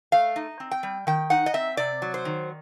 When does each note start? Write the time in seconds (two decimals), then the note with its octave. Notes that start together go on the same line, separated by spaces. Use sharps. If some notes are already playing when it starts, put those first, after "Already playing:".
0.12 A3 F5
0.36 D#4
0.60 C4
0.71 G5
0.83 G3
1.07 D#3 G5
1.30 D#4 F#5
1.46 D#5
1.54 C4 E5
1.77 C3 D5
2.02 F#3
2.14 C5
2.25 D#3